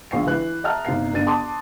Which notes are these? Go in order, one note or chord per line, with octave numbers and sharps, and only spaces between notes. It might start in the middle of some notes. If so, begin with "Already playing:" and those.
A#1 F5 G5 C#6 C7
E3 F#6
D#5 E5 G5 A5 A#5 F6
G1 C3 D#4 F5 G5 C7
G1 D4 A6 D#7
A5 C6 D6 D#6